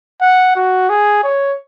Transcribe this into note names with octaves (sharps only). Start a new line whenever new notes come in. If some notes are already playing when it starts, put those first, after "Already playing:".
F#5
F#4
G#4
C#5